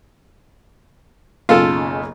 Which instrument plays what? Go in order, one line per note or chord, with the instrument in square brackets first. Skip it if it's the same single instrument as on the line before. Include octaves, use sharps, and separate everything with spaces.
[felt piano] F#1 B1 C#3 [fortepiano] F4 A4